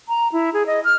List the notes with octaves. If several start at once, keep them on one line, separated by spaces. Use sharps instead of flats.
A#5
E4
G#4
D#5
F6